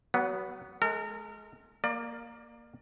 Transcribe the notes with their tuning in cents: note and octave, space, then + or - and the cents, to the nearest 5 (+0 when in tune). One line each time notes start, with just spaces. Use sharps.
F#3 +35 B3 -10
G#3 +30 A#4 -35
A#3 +0 D5 +30